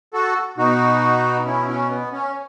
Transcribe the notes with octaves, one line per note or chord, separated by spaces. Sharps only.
F#4 A4
B2 D#4 F#4
C#4 E4
C#4
B3
C#4